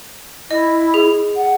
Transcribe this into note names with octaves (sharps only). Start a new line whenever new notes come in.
E4 D#5
G#4
F#5